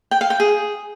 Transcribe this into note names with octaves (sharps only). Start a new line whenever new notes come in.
G5
F5
G5
G#4